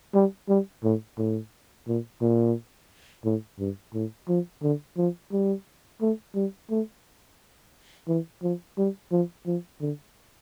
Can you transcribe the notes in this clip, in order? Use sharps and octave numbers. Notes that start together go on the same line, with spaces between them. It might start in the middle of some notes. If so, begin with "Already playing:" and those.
G3
G3
A2
A2
A#2
A#2
A2
G2
A2
F3
D3
F3
G3
A3
G3
A3
E3
F3
G3
F3
F3
D3